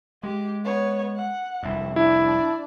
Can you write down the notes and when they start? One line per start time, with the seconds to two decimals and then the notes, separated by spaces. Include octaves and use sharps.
0.23 G#3 G4
0.64 B3 C#5
1.16 F#5
1.63 F1 C2 G2 E4
1.96 D4 E4 D5